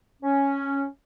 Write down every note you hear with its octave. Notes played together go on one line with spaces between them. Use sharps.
C#4